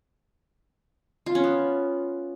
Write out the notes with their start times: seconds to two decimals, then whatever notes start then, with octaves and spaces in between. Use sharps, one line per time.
1.26 F4
1.35 C#4
1.44 B3